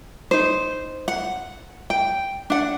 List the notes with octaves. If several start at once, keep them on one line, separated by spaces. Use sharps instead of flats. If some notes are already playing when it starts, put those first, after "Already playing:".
D#4 C5
F#5
G5
D4 F#5